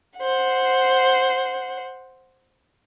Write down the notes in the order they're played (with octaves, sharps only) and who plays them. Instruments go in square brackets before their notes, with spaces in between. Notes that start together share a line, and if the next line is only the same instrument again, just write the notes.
[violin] C5 F#5